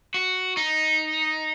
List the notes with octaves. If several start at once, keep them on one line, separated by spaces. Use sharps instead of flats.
F#4
D#4